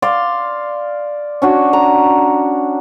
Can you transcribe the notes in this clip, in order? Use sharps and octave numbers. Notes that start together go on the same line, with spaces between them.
D5 F5 C6
C#4 D4 F#4
A#5